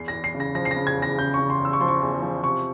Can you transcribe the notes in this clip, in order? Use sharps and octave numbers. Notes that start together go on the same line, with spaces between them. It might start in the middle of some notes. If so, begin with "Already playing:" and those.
Already playing: E2 C7
A#6
E2
C7
C#3
A#6
F3 A#6
C7
A#6
C#3
G#6
E2
A#6
C#3 G6
C#3 C#6
C6
E2
E6
C#6
F3 C6
C#6
E2
F3
C3 C#6